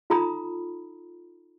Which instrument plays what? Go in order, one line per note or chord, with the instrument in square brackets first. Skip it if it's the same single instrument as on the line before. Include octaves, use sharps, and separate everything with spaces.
[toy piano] D#4 F4 A4 A#5 B5 D#6